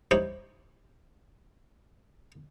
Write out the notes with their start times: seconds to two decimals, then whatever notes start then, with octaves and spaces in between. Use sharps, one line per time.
0.11 D#4 E4 G4 C5 C#5